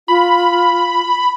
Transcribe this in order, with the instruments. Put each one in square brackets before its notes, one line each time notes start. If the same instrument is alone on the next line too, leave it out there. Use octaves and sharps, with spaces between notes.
[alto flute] F4 [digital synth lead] B5